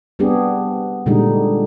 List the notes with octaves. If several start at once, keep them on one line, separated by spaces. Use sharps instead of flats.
G3 B3 C4 D4 G4 G#4
A#2 D3 G3 G#3 D#4